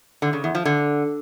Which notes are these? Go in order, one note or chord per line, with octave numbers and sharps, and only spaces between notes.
D3
C#3
E2
F3
D3